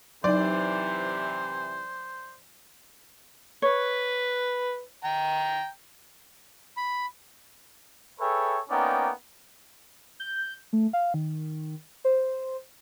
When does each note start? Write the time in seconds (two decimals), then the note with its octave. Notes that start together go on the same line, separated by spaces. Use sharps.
0.24 C3 E3 F#3 D#4 C5 D5
3.62 B4 C#5
5.04 G5 A#5
6.77 B5
8.20 G#4 A4 B4 C#5 E5 G5
8.70 A#3 B3 C#4 D#4 D5 G5
10.20 G6
10.73 A3
10.93 F5
11.14 D#3
12.05 C5